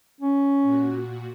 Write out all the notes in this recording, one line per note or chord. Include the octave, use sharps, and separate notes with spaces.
C#4
A#2 F#4